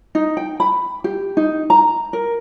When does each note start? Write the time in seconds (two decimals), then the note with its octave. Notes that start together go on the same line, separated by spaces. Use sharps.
0.15 D#4
0.37 G5
0.60 B5
1.04 G4
1.37 D#4
1.70 A#5
2.13 A#4